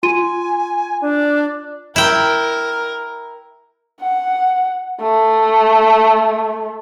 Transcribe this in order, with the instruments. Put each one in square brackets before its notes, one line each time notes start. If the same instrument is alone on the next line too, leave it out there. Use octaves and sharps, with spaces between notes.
[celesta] F4 C6 D#7 [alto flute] G#5
[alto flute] D4
[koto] E4 G5 [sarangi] A#4
[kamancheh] F#5
A3